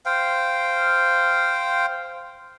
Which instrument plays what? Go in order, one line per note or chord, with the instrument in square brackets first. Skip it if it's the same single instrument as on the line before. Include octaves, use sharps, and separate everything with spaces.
[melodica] C5 F5 G5